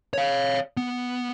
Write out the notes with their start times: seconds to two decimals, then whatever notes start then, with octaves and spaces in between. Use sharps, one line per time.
0.14 C#5 F5
0.77 B3